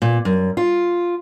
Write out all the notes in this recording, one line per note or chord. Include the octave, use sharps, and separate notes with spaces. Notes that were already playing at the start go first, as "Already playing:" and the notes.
A#2
F#2
F4